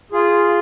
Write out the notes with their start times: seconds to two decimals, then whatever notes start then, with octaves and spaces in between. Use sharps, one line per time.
0.12 F4 G#4